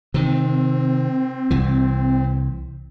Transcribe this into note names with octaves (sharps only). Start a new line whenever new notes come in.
C3 D#3 C4
C2 E3